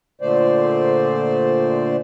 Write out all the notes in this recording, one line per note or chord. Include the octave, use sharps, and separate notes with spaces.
A#2 D3 A3 C5 D5